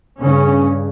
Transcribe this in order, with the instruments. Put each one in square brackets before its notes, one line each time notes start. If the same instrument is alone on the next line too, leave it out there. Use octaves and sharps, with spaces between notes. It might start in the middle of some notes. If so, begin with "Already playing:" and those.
[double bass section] G2 C#3 C#4